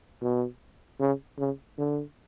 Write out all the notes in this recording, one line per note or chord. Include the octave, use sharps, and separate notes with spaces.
B2
C#3
C#3
D3